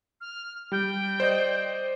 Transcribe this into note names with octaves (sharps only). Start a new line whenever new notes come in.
F6
G3 G5
C5 D5 D#5